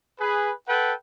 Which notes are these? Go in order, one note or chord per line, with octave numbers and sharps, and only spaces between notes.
G#4 B4
A4 B4 F#5 G5